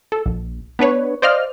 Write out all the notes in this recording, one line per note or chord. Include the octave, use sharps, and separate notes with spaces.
A4
A#1
B3 D4 B4 C#5
C5 D5 D#5 F5 F6